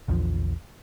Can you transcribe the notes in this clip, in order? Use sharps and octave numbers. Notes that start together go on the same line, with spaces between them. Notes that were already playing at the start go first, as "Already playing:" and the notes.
A#1 E2 D3 F3